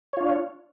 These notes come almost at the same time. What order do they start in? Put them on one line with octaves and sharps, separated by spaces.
C#5 F4 D4